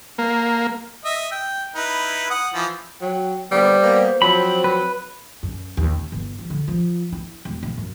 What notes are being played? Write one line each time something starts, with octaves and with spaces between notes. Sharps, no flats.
A#3
D#5 E5
G5
D#4 E4 B4
F#5 D#6
E3 F3
F#3 G5
D3 G3 A#3 B3 C5
A#3 B3
F3 F#3 C4 B5
B4
F#2
D#2
C#3
G1
F3
D3
F3
E4
E1
A#3
F#2